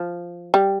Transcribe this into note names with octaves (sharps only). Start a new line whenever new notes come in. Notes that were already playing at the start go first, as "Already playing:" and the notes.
Already playing: F3
G3